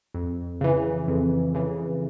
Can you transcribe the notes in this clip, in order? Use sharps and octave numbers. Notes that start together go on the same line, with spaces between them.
F2
C#3 E3
F2
C#3 E3